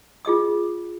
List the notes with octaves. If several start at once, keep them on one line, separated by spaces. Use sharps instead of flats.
F4 G#4 D#5 D#6